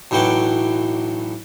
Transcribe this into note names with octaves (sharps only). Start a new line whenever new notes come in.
B1 A2 E3 F#3 G5 D6